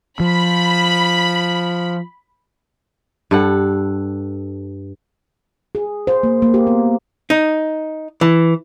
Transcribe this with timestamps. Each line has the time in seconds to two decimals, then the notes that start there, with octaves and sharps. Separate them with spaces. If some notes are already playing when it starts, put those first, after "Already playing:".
0.20 F3 B5
3.31 G2 A4 F#5
5.75 G#4
6.07 C5
6.23 A#3
6.42 A#3
6.54 G4
6.67 B3
7.30 D#4
8.21 E3